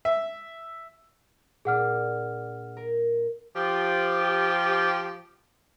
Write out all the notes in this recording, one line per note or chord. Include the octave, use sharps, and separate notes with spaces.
E5
A#2 D4 G#4 F#5 F6
A#4
F3 G4